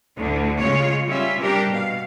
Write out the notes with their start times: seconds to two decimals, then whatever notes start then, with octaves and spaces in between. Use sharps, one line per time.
0.18 D2 A2 D3
0.59 C#3 G#3 F4 C#5
1.08 G3 C#4 F4 E5
1.39 C3 G3 D4 G4 A#4
1.70 B2 F5